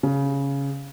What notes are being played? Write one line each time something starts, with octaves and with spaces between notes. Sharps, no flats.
C#3